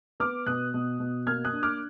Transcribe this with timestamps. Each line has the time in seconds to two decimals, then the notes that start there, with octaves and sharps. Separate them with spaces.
0.20 B3 D6 F6
0.46 B2 D#6 F#6
0.74 B2
1.00 B2
1.27 A#3 F6 G#6
1.45 D#6 F#6
1.53 D4
1.63 D6 F6